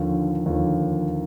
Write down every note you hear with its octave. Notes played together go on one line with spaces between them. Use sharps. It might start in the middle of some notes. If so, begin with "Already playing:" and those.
Already playing: D#2 D3 F3
D#2 D3 F3